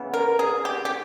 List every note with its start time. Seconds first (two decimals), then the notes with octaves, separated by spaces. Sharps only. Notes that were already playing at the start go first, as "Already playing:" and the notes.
Already playing: C#3 E3 B3
0.14 A#4
0.39 G#4
0.65 G4
0.85 G4